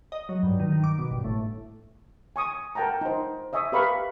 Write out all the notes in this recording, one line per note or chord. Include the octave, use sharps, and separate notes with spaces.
D#5
F#3
G2
D#3
D#3
D6
B2
G1
A2
G#5 C#6 D#6
A#4 F#5 G5 A5 A#5
D#4 C5
D#5 E5 G#5 C#6 D#6
G4 A#4 B4 F5 B5 C#6